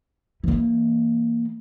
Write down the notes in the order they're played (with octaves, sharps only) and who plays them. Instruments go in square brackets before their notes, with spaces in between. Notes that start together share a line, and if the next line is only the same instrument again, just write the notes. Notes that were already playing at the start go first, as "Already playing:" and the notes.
[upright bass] E3 A#3